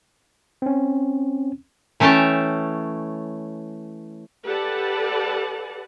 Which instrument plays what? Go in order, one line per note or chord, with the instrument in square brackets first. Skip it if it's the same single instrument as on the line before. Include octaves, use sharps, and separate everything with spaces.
[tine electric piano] C4 C#4
[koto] E3 A3 C#4 C#5 G5 A5
[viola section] G4 A4 B4 D5 F#5 A5